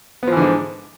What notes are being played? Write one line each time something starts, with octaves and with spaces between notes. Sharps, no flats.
G#2 D3 E3 F3 B3